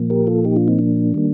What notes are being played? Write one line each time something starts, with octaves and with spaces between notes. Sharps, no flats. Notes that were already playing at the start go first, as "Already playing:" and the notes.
Already playing: A#2 F3 A#3
G4 A#4
F4 A4
D#4 G4
D4 F4
C4 D#4
D4
D#3 G3 A#3